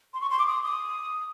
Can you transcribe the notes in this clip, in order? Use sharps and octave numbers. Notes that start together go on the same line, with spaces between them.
C6
C#6
C6
D6
D#6
D#6